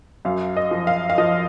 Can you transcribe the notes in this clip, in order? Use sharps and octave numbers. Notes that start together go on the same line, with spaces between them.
F#2 F5
D#5
F3
F5
F5
F3 D#5